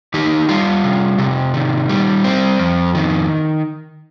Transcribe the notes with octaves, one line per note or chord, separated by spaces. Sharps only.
D#3 D#4 G4
G3 F4
C3
C3
D#3
G3
C4
F2
D#3